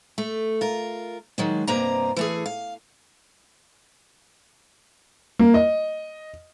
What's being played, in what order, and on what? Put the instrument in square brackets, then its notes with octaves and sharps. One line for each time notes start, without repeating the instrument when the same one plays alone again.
[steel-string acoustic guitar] A3
F4 A#4
D#3 F#3 G#3
G2 C3 A#3 C4 D#5 A#5
E3 A3 G#4
F5
[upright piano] A#3
D#5